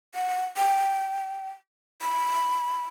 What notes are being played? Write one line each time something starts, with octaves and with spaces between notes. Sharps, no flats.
F#5
G5
B5